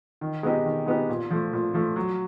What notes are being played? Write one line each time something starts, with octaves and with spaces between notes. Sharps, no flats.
D#3
G#3 B3 D#4 G4
D#3
G#3 B3 D#4 G4
A#2
F3 A3
A#2
F3 A3
F#3